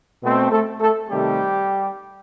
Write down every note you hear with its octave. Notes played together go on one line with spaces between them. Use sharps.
B2 A3 C4
A3 A4
A3 A4
C3 D#3 G3 A3 C4 G4